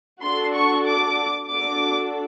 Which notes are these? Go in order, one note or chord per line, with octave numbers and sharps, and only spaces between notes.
D4 F#4 A4 C6
C#6
D6
D4 F#4 A4 D6